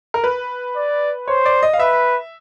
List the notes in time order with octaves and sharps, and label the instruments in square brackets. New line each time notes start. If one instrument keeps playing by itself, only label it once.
[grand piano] A#4
B4
[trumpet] D5
[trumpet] C5 [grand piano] C#5
[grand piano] D5
D#5
F5
[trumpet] B4 [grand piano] E5